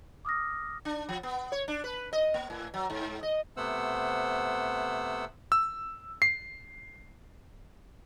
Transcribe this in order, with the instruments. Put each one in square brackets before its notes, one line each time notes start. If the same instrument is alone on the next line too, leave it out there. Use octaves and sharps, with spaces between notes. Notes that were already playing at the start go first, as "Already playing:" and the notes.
[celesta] D6 D#6 F6 A#6
[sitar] D4
F3
B3
C#5
D4
B4
D#5
A#3
A2
F#3
G#2
D#5
[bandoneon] C3 A3 B3 C5 F#5 E6
[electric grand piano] E6
C7